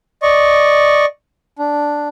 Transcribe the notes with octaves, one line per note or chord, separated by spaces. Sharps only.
D5 D#5 C#6
D4